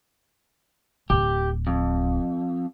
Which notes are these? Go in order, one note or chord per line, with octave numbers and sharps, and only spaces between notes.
D1 G4
F2